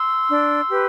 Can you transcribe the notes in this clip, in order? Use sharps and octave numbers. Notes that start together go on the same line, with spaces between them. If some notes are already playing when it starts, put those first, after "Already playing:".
Already playing: C6 E6
D4
G4 B4